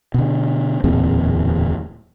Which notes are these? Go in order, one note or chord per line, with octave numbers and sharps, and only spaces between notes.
B2 D3
D1 E2 A#2 C4